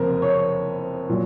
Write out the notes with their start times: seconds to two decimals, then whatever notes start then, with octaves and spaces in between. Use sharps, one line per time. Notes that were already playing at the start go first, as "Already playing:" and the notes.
Already playing: F#1 F2 C3 A#4 C5
0.22 C#5
1.09 A#2 F#3